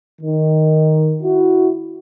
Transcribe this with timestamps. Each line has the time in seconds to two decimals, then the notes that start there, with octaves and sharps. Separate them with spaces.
0.21 D#3
1.22 E4 F#4